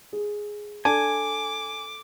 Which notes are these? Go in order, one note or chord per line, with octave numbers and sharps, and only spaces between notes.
G#4
D4 A4 G#5 D6